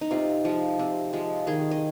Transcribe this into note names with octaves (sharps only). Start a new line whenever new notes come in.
D#4
C3 F4
F3 G#3
C3
F3 G#3
D#3 G#4
D#5